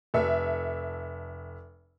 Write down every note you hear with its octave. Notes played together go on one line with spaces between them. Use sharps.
F1 A4 E5